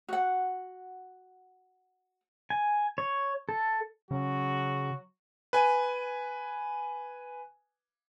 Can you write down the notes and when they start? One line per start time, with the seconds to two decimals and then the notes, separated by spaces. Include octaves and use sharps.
0.09 F#4 F#5
2.50 G#5
2.98 C#5
3.49 A4
4.11 C#3 F#3 F#4
5.53 B4 G#5